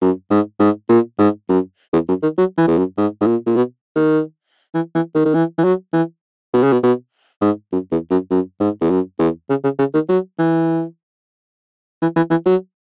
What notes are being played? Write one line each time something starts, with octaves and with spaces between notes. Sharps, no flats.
F#2
G#2
G#2
A#2
G#2
F#2
E2
F#2
D#3
F#3
E3
E2
F#2
G#2
G#2
A#2
A#2
B2
D#3
E3
E3
D#3
D#3
E3
E3
F#3
E3
B2
C#3
B2
B2
G#2
F#2
E2
F#2
F#2
G#2
E2
F#2
E2
C#3
C#3
C#3
D#3
F#3
E3
E3
E3
E3
F#3